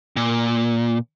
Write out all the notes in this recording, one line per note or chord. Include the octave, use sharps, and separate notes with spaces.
A#2